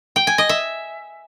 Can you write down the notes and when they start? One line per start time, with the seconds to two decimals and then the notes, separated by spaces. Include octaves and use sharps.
0.16 G5
0.27 G#5
0.38 D#5
0.49 E5